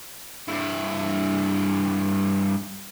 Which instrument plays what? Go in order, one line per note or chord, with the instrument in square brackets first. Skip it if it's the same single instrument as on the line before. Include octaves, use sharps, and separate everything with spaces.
[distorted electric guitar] G2 E4